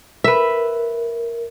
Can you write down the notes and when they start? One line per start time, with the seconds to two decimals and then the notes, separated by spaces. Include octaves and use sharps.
0.24 A#4 B4 E5